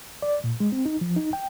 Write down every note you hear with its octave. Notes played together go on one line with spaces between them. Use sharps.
D5
A#2
G#3
C4
D#4
F3
D#4
G5